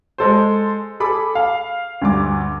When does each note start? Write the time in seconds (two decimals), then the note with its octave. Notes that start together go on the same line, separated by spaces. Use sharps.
0.18 G#3 A4 C5
1.00 G#4 A4 B5 D6
1.35 F5
2.02 D2 G2 D6